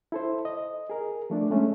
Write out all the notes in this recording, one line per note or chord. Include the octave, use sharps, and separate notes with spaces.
E4 A4 C5
D#5
G#4 A#4
F3 A3 D4
G#3 A3 C#4